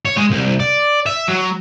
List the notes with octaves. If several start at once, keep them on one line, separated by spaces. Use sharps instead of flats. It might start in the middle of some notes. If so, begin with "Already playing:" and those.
C#5
G#3
C2
D5
E5
F#3